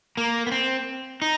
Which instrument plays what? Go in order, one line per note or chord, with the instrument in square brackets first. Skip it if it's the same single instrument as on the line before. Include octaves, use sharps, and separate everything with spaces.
[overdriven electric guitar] A#3
B3
C4
D#4